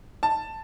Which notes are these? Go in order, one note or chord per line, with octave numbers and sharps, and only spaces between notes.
A5